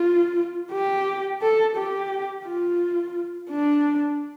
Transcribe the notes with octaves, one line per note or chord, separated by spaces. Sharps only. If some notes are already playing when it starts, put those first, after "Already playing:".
Already playing: F4
G4
A4
G4
F4
D4